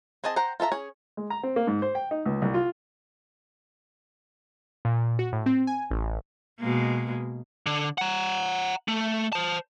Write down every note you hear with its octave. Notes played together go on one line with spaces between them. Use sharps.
C4 G#4 D#5 A5
C5 F#5 G5 A#5
F4 A4 E5 A#5
C#4 G#4 C#5
G#3
A#5
C4
A#3
G#2
C5
G5
D#4
C#2
C2
F4
A#2
F#4
A2
C4
G#5
A1
B2 G#3 A#3
D3
F#5 A#5
A3
C5 A5